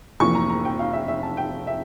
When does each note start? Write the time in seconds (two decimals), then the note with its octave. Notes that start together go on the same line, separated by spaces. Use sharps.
0.20 F1 F2 E3 A#3 C#6
0.35 A#5
0.50 A#5
0.65 G5
0.79 F5
0.93 E5
1.08 E5
1.23 A5
1.37 G5
1.67 E5